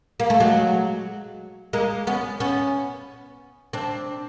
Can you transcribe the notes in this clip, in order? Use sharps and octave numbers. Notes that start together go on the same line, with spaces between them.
A#3
A3
F#3 G#3
G#3 A#3
B3 C#4
B3 C#4
C4 D4